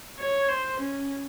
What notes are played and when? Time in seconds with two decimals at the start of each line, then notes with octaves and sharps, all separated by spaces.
0.19 C#5
0.49 C5
0.80 C#4